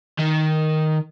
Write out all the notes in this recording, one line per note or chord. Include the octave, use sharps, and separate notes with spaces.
D#3